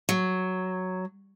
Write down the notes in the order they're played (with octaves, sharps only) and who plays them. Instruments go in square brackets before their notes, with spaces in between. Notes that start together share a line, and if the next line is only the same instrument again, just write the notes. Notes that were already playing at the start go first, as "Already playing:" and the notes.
[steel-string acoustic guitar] F#3